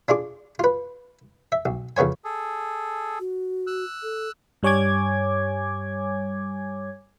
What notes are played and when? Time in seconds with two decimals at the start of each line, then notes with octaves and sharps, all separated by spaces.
0.08 D4 F4 G#4 D6
0.59 F4 B4
1.52 E5
1.65 B1
1.97 F2 C#3 B3 C#5 G#5
2.25 G#4 A4
3.19 F#4
3.67 E6 F#6
4.03 A4
4.63 G2 G3 C#5 G#5 D6 G#6